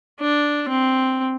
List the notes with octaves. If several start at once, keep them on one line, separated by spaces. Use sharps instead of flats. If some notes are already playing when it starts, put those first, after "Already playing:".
D4
C4